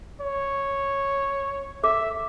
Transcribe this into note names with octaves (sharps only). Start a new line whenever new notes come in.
C#5
A4 E5 D6